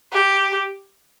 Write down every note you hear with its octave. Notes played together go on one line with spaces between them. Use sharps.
G4